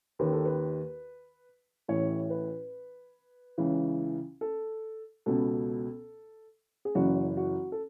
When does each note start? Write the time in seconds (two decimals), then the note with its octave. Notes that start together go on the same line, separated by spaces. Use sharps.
0.19 D#2 D#3 B4
0.33 A4
0.45 B4
1.88 A1 A2 E3 C#5
2.30 B4
3.58 C#2 C#3 E3
4.41 A4
5.26 C#2 B2 A4
6.85 G#4
6.95 F#1 F#2 C#3 E3 F#4
7.37 F#4
7.72 A4